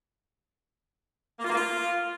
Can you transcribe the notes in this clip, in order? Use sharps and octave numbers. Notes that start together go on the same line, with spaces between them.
A#3
F4
A#3
F4